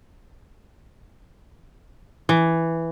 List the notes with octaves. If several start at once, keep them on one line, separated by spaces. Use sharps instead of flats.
E3